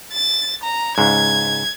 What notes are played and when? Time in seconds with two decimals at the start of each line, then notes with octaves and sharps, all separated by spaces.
0.13 A6
0.63 A#5
0.98 C#2 G#2 G#6